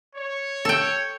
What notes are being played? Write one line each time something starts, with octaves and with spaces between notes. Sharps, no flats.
C#5
A4 G5